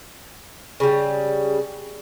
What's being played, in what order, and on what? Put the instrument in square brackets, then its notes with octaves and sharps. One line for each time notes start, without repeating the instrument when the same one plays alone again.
[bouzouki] C#3 G3